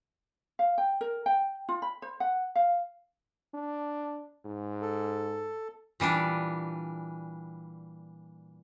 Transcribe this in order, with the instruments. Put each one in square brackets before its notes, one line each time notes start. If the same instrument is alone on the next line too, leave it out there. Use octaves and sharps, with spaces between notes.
[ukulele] F5
G5
A#4
G5
F4
B5
C5
F#5
F5
[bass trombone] D4
G#2
[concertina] A4
[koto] A#2 E3 G3 D4